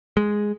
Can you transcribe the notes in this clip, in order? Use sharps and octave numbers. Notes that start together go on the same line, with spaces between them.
G#3